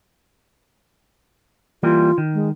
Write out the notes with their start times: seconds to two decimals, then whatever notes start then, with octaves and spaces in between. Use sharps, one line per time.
1.83 E3 G3 A#3 F4
2.18 D#3
2.34 G#3